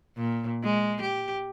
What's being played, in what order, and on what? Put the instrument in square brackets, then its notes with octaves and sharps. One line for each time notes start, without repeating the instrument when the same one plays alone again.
[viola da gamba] A#2
G#3
G4